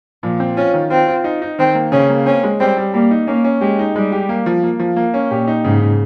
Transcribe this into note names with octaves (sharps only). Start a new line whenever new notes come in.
A#2 F3
C4
C#4 F4
D#3
C4 F4
F4
D#4
D#4
D#3 C4
A#3
C#3 C#4
A#3
C4 C#4
G#3
G3 C4
G3
G3 A#3
D#4
A#3 C#4
C#4
G#3 G4
D#4
G3 G#3
G4
A#3
F3
A#3
F3
A#3
C#4
A#2 G4
D#4
G#2 C#3
C#3